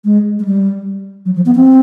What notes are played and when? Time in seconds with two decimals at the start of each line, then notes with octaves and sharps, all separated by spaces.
0.05 G#3
0.39 G#3
0.45 G3
1.25 F#3
1.36 F3
1.46 B3
1.56 C4